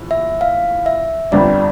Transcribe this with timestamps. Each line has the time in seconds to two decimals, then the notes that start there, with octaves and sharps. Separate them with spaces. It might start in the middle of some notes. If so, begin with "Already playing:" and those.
Already playing: A#1 A2 E3
0.11 E5
0.41 F5
0.86 E5
1.31 G1 F2 D3 G3 D4 D5